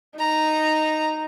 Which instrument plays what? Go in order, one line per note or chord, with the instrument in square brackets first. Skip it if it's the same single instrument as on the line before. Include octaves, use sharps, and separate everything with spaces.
[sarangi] D#4 [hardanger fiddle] A#5